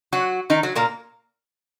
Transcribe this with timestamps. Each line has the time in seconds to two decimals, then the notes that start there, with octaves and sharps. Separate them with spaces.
0.12 F#3 F#4
0.50 D#3 D#4
0.63 F#3 F#4
0.75 A#2 A#3